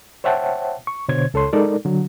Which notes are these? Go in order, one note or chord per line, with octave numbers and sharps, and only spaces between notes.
C5 C#5 E5 F#5 G5 A5
C#6
B2 D3 C5 C#5 G#6
C#2 A4 C#5 C6
G#3 D#4 A4 A#4 D5
D3 F#3